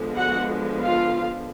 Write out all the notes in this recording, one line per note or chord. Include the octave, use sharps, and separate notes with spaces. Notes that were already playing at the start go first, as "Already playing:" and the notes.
Already playing: D3 F3 G#3 B3
F#4 F#5
F4 F5